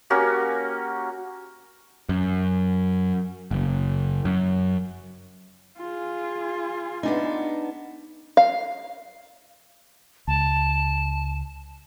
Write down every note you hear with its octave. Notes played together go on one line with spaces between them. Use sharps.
A#3 C#4 F#4 G4
F#2
F#1
F#2
F4 G#4
B3 D4 D#4
F5
C#2 A5